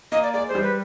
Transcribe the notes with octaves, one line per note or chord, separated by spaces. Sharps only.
A#3 D#5
D5
G#3 D5
G#3 C5
G3
B4